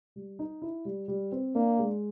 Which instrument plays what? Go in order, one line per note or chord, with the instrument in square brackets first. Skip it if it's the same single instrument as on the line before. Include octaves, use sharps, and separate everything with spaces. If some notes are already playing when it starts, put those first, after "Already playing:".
[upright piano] G3
D#4
E4
G3
G3
C4
[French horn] A#3 [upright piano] D4
[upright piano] G#3